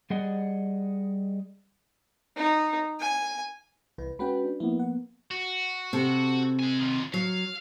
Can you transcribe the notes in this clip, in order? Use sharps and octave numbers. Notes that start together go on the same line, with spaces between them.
G3 G#4 D5 D#5 F#5
D#4
G#5
C2 E3 B4
G#3 C#4 F#4 B4 G5 B5
D4
F3 A#3 B3 E4
F#5
F#4
C3 A4
D#4 G#5
D#3 F4
F#3 F5